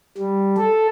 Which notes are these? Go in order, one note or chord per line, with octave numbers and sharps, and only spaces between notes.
G3
A4